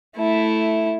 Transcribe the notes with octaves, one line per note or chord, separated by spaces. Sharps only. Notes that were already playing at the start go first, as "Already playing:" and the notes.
A3 E4